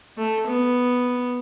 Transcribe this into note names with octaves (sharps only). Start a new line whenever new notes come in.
A3
B3